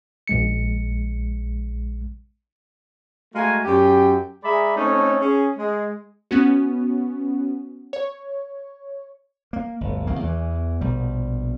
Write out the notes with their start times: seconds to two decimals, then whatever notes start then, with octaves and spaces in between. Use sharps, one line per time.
0.28 A#1 G#3 C#7
3.34 G#3 A3 F#4 F5 G#5 A#5
3.65 F#2 G4 G5
4.44 G#3 G#4 D5 E5 A#5 B5
4.76 A3 C4 C#4 D#4 A4 C#5
5.19 C#4 G#4
5.57 G#3
6.31 B3 C#4 F#4
7.93 C#5
9.53 A#3
9.81 G1 D2
10.07 C2 D#3 A#3
10.20 E2 E3
10.81 A#1 B2 G3